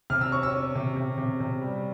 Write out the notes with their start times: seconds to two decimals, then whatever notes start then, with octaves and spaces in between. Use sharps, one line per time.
0.10 C3 F6
0.21 E6
0.31 C#4 C#6
0.43 E6
0.54 C#4
0.75 C3
0.97 C3
1.18 C3
1.40 C3
1.61 G3